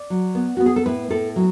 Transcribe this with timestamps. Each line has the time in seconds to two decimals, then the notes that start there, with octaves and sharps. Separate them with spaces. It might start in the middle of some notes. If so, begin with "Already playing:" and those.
Already playing: D5
0.10 F#3
0.35 B3
0.57 B3 F#4
0.66 G#4
0.76 A4
0.86 A2 B4
1.10 A2 A4
1.36 F#3